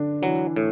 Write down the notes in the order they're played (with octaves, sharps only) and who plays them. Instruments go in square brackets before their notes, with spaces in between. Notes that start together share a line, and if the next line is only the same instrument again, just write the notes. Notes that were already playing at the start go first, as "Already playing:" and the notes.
Already playing: [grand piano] D3 D4
[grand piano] E3 [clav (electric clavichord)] F#3
[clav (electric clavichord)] A2